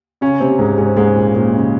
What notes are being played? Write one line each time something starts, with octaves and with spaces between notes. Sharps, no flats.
C#3 C#4
C3 C4
G#2 G#3
G#2 G#3
G#2 G#3
A#2 A#3
A#2 A#3
C#3